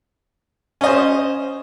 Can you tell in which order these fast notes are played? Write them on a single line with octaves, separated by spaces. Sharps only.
C#4 D#5 C5